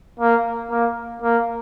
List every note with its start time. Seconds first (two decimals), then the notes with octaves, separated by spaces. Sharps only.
0.20 A#3
0.71 A#3
1.22 A#3